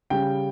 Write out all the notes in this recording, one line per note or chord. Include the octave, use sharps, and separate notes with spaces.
C#3 G3 C#4 G5